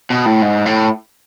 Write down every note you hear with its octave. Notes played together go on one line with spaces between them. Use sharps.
B2
A2
G#2
A2